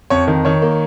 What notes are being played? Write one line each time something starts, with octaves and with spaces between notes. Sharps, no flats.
F2 C#5
D#3
D#3 C#5
A#3